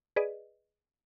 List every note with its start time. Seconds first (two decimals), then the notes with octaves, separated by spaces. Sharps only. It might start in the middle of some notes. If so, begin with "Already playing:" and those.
0.16 G#4 B4 D5 D#5